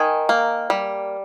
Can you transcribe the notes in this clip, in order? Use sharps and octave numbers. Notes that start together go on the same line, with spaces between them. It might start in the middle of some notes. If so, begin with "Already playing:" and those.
Already playing: D#3 G#5
A#3
G3